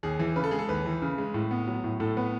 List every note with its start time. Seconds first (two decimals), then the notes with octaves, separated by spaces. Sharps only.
0.03 D#2 G#4
0.19 E3
0.36 C#3 B4
0.44 A4
0.51 G#3 G#4
0.59 A4
0.69 D#2 B4
0.85 E3
1.02 C#3
1.18 G#3
1.34 A2
1.51 B3
1.67 F#3
1.84 A2
2.00 A2 A4
2.17 B3 B4